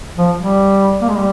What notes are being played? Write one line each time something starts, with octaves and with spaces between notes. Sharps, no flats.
F3
G3
A#3
G#3
G3